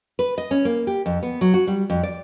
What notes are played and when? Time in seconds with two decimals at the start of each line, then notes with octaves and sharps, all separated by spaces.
0.19 B4
0.38 D#5
0.51 C#4
0.65 A#3
0.87 G4
1.06 F2
1.23 B3
1.41 F#3
1.54 F#4
1.67 G3
1.90 F2
2.03 D5